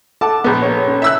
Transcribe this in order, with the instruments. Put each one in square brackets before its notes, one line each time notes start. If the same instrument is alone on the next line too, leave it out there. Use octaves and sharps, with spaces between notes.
[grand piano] A4 F#5 D6 [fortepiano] A5
[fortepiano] A#1 B3
[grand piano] C#5
C#4
[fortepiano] E5 E6 F#6